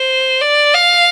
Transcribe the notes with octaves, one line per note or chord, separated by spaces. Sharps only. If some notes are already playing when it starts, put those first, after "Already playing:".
Already playing: C5
D5
F5